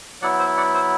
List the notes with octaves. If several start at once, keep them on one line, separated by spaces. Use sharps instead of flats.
F#3 B3 E4 D5 F#5
C5 E5
D5 F#5
C5 E5